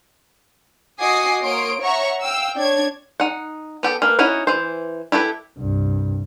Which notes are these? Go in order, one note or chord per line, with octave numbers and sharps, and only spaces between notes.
F#4 D#5 G#5 D6 D#6 C7
A#3 C#5 C6 D#6 D7
C#5 E5 F#5 A#5 C#6
F5 G5 E6
D4 C#5 G#6
D#4 F#5
B3 G4 A4
A#3 B4
C#4 D#4 E4 F#4 F#5
E3 C5
E4 G4 A4 B4
C2 G2